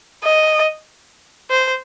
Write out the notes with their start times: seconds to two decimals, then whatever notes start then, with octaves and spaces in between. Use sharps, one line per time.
0.24 D#5
1.51 C5